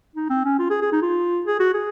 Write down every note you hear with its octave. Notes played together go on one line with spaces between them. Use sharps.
D#4
C4
C#4
F4
G#4
G#4
D#4
F4
G#4
F#4
G#4